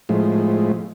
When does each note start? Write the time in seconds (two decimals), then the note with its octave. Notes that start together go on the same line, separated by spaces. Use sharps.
0.09 A2 F3 G#3